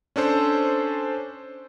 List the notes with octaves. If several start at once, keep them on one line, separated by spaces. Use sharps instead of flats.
C#4 D4 A4 C5